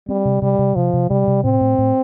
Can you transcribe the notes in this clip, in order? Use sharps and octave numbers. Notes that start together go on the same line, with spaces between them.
G3 C4
C3
C3 G3
C3
C3 F3
C3
C3 G3
C3
A2 C4
A2
A2